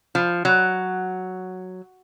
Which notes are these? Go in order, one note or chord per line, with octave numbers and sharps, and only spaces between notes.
F3
F#3